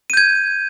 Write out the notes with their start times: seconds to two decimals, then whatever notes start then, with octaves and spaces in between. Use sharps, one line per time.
0.10 D#7
0.13 G6
0.17 G#6